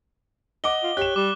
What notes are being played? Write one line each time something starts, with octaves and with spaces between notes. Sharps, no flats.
D#5 F#5 D6 G7
F4
G4 C#5 F#6 E7
G3 D6